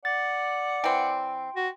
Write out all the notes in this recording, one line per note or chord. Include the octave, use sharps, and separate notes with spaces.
D5 F#5 A6
E3 C4 G5 C6
F#4